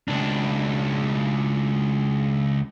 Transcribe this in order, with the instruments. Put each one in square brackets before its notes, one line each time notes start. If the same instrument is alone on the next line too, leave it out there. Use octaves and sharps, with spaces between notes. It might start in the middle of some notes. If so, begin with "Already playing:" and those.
[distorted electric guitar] C#2 D4